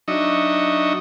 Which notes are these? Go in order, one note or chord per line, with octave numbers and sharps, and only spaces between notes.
F#3 D4 D#4 D#5 E5 C#6